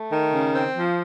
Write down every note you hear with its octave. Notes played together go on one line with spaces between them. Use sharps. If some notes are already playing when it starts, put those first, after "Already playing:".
Already playing: A3
D#3
C#3
C4
F3